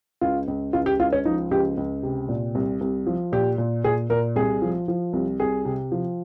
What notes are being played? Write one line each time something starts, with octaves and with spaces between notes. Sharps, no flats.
C#2 F4
C#2
C#2 F4
G4
C#2 F4
C#4
F3 D#4
C#2 G4
C#2
C3
A#2
C2
C2
F3
A#2 G4
A#2
A#2 G#4
A#2 A#4
C2 G#4
F3
F3
C2
C2 G#4
C3
F3